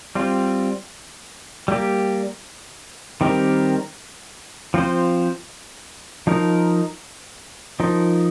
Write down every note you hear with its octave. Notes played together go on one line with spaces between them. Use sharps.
G3 C4 F4
G3 A#3 G4
D#3 G3 C4 G4 A#4
F3 C4 F4 C5
F3 D#4 A#4
F3 D#4 A#4